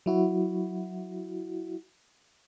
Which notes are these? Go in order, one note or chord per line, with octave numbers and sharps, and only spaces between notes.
F#3 E4 F#4